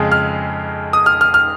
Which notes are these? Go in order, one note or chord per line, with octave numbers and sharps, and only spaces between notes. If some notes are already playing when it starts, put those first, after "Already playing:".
Already playing: F2 C#3 G#3
F6
D#6
F6
F6
F6